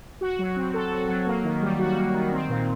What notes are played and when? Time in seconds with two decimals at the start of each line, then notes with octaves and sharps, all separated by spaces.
0.21 F#4
0.39 F#3
0.56 C4
0.74 A4
0.92 F#4
1.08 F#3
1.27 A#3
1.44 D#3
1.62 G3
1.79 F#4
1.96 A#3
2.14 D#3
2.32 C4
2.49 A#2